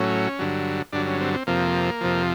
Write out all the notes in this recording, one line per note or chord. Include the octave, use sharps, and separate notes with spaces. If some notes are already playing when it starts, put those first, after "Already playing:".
Already playing: A2 F#3 C#4
G2 D3 F#3
G2 D3 F#3 D4
C#4
C4
C4
F2 C3 F3 A#3
F2 C3 F3